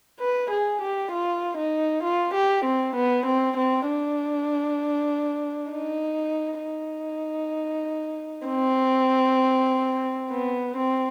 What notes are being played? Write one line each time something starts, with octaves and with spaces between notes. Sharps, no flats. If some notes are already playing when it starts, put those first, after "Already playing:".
B4
G#4
G4
F4
D#4
F4
G4
C4
B3
C4
C4
D4
D#4
D#4
C4
B3
C4